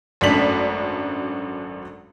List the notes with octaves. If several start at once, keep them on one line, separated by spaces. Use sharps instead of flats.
G#1 F#2 A3 D4 B6 F#7